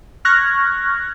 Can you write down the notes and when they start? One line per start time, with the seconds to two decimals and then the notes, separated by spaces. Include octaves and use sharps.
0.25 C#6 F6 F#6 G#6 A#6